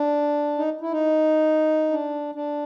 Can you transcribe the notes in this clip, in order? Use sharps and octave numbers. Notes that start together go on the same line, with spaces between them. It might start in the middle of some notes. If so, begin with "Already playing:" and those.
Already playing: D4
D#4
E4
D#4
D4
D4